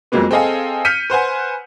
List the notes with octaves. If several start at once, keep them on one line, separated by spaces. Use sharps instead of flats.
F2 F#3 G#3 A#3 B3
C4 G#4 A4 D#5 F5 G#5
F6 G6 B6 C#7 D#7
B4 C5 F#5 G#5